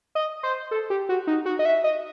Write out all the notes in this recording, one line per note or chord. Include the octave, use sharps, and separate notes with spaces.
D#5
C5
A4
G4
F#4
D#4
F#4
D#5
E5
D#5